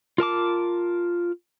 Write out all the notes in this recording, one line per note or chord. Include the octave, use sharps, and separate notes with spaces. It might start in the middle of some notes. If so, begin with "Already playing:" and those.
F4 A#4 A5 D6